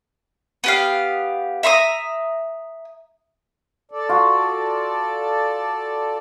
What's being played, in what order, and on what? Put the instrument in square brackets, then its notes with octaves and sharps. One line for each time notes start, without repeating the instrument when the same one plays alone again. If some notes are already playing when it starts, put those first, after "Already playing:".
[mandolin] B3 G4 F5
E5 A#5 C6 D#6
[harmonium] A4 D5
[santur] F4 F#4